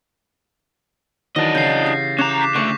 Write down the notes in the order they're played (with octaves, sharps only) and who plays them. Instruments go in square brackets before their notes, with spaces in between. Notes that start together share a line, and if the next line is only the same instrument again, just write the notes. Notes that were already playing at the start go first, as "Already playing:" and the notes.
[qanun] D#3 E3 F#3 [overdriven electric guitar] D4 D#5 [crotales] A6 A#6
[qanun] C#3 [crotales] G6 C7
[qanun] G4 G#5
[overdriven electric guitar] C#4 A#5 [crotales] D6 F#6 E7
[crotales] D6 B6
[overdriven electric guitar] D3 A3 [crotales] C#6